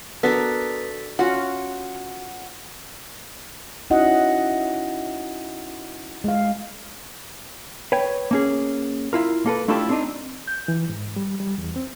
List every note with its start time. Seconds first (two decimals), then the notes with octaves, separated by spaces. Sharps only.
0.23 B3 D4 F#4 A4 A#4 A6 B6
1.19 C#4 F4 F#4 F#5
3.90 C#4 D#4 E4 F#4 D#5 F#5
6.24 G#3 F5
7.92 B4 C#5 G5
8.31 A#3 C#4 G#4
9.13 E4 F4 A#4
9.46 A#3 A4 B4
9.68 A3 D4 E4 F4 G4 A4
9.89 C4 D4 D#4
10.48 G6
10.68 E3
10.89 G#2
11.16 G3
11.40 G3
11.58 E2
11.76 C4